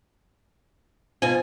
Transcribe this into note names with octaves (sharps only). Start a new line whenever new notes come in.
B2 F3 G#5